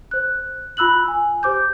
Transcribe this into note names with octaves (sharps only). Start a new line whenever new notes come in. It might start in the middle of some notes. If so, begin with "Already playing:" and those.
C5 F#6
F4 B5 E6 F#6 F#7
G#5
G4 C5 D6 G6